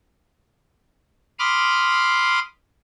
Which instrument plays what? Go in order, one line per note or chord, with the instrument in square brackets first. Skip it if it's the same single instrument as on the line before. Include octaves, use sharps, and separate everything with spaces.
[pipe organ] B5 C6 D6 D#6 F6